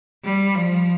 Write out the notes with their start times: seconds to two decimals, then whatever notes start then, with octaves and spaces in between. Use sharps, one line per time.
0.25 G3
0.55 F3